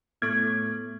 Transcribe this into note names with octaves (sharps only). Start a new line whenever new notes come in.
A2 B3 A4 C#6 G#6